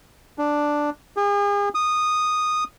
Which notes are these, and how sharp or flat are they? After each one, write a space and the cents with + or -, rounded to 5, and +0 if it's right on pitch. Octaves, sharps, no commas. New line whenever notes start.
D4 +0
G#4 -40
D#6 -10